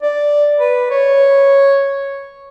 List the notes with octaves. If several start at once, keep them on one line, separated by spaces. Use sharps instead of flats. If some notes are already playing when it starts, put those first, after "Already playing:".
D5
B4
C#5